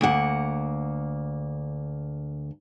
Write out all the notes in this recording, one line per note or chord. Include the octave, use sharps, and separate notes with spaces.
D2 A#3 F#5